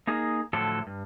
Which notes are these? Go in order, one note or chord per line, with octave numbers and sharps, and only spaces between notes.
A#3 D#4 G#4
A2 D3 F3 F#3 E4 A4
G2